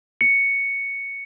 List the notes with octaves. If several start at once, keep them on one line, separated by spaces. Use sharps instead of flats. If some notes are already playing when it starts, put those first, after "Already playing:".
C#7